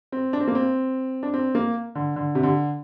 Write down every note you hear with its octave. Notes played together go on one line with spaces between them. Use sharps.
C4
D4
C4
A#3
C4
D4
C4
A#3
D3
D3
C3
D3